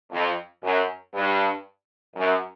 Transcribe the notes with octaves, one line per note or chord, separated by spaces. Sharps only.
F2
F#2
G2
F#2